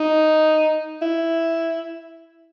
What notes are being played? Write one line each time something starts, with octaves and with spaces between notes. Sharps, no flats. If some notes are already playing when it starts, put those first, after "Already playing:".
Already playing: D#4
E4